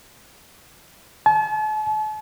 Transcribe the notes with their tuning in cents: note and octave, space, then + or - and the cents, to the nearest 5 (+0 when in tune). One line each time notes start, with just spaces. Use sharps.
A5 -40